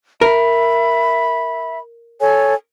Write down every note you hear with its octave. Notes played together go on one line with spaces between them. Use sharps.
A#4 E5 B5
A4 C#5 G#5